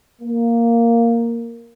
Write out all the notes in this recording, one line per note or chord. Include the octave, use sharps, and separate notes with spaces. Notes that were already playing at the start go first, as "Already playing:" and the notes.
A#3